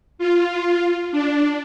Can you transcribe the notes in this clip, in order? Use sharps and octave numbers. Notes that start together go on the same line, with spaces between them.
F4
D4